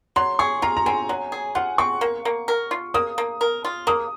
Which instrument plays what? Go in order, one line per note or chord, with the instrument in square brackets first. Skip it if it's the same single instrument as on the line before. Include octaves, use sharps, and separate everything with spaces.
[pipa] F#3 [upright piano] C6
[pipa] G#4 [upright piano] C#6
[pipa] F4 [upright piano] A#5
[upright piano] A#5
[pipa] C4 [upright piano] G#5
[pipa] F#3
G#4
[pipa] F4 [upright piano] F#5
[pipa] C4 [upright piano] C#6
[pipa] A#3
A#3
A#4
F4
[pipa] A#3 [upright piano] D#6
[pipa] A#3
A#4
F4
[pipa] A#3 [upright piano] D#6